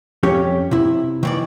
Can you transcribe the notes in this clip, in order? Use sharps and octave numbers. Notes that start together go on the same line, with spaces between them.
F2 C#4 G4 C#5
C3 E4
D#3 E3 D5